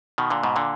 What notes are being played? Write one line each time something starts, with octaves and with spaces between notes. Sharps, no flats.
B2 D#3
A#2 D3
G#2 B2
A#2 D3